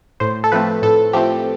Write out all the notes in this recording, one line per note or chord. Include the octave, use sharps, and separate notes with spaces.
A2 C5
A4
F3 A3 C4 B4
A2 A4
F3 A3 C4 G4